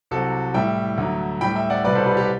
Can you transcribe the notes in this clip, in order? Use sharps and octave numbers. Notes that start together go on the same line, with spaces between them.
C2 C3 F#3 F#4 A4
A2 G3 E5 G5
D2 D3 F#3
A2 G3 G5 B5
E5 G5
D5 F#5
C2 B2 G3 B4 D5
A4 C5
G4 B4
G4 B4